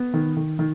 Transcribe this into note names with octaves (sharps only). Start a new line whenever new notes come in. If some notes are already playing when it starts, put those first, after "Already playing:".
Already playing: B3
D#3
D#3
D#3